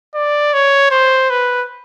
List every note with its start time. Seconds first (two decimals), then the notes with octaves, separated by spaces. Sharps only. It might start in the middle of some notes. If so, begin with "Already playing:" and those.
0.15 D5
0.54 C#5
0.91 C5
1.30 B4